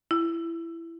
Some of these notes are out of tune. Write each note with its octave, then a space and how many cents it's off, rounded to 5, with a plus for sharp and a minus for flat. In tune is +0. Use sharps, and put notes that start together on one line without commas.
E4 +15